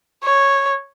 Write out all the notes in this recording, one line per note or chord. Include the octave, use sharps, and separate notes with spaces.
C#5